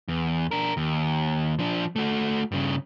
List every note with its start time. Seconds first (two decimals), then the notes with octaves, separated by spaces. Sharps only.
0.08 E2
0.51 D4 A#4
0.77 D#2
1.59 F3 D4
1.96 A3 F#4
2.52 G2 C#3